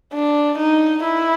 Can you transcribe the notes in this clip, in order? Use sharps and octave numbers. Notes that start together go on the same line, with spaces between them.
D4
D#4
E4